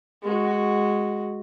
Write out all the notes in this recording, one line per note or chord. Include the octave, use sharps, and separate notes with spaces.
G#3 F#4